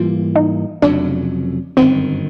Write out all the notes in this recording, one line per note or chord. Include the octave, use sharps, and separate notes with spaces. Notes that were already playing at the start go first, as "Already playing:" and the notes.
Already playing: G#2 E3 G3 A#3 F4
D#4
F1 F2 C#3 F#3 D4
G1 F#2 D#3 C4